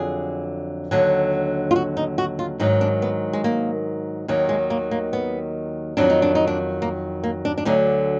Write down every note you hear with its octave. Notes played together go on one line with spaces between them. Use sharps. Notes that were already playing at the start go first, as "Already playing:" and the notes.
Already playing: F2 D3 F#3 G#4
D#2 D3 F#3
F4
F#4
D#4
F#4
F4
G#2 D#3 F#3 D#4
D4
B3
G#3
A#3
D#2 D#3 F#3
G#3
A#3
A#3
B3
F2 D#3 F#3 D4
D#4
D4
D#4
D4
A#3
A#3
D4
D4
D2 D3 F#3 D#4